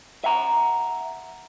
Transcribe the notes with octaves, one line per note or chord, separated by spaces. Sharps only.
E5 F#5 A#5